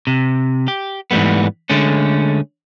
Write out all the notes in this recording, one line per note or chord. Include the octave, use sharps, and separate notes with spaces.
C3
G4
G#2 E3 G3 A3 B3
D3 G#3 A3 C#4